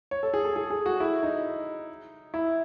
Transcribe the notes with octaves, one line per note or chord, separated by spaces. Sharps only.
C#5
A4
G#4
A4
G#4
G#4
F#4
E4
D#4
E4